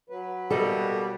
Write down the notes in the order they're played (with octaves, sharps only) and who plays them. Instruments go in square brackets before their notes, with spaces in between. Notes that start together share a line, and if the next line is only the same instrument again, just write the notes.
[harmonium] F#3 B4
[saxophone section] B2 G3 A#3 [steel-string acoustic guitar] A4 D#5 E5